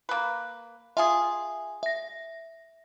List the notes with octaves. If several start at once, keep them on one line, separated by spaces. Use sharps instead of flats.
A#3 B4
F4 G#4 E5 G#5
E5 A#6